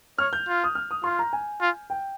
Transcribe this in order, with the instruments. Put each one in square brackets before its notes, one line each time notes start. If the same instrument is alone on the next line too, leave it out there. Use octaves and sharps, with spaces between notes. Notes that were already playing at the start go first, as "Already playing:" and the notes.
[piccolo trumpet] C#5 [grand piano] F6
[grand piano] G6
[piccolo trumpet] F4
[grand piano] D#6
F6
D#6
[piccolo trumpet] F4 [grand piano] C6
[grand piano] A#5
G#5
[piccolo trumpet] F4
[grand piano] G5